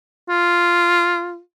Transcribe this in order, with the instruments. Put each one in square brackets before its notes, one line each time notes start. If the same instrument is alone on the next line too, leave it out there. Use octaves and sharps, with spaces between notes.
[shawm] F4